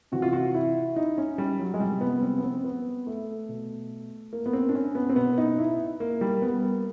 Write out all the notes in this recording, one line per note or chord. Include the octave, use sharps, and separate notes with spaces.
C3 E3 F#4
F4
F#4
E4
D#4
C#4
G3
F#3
G#3
C3 F3 G3
B3
C4
B3
C4
B3
A3
B2
A#3
B3
C4
D4
C#4
B3
C4
B2 B3
D#4
E4
A#3
G3
B3
A#3